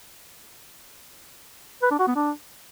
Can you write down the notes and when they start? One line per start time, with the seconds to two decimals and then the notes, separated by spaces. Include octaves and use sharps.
1.82 B4
1.91 D4
1.99 F#4
2.08 B3
2.16 D4